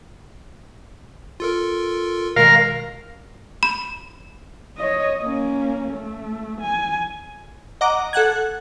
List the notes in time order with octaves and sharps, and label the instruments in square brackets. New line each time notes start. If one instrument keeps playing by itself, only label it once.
[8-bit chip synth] F4 A4 A#4
[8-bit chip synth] B2 D#3 G#3 [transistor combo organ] A#4 F5
[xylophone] B5
[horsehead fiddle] C#5 D#5
A#3 C#4
A3
G#5
[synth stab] D#5 F#5 A#5 D6
A4 F#5 F#6 G#6